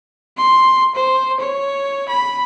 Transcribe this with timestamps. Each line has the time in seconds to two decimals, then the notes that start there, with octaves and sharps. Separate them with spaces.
0.38 C6
0.95 C5
1.40 C#5
2.09 B5